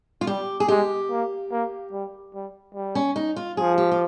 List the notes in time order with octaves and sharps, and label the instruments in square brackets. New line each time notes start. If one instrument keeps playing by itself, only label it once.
[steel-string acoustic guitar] F4
[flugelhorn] G3 [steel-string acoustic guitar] G4
[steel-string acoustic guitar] G#4
[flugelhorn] G#3 [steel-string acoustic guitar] G4
[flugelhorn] A#3
A#3
G3
G3
G3
[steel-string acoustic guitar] C#4
D#4
F4
[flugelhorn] F3 [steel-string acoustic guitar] G#4
[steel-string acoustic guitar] G4
F4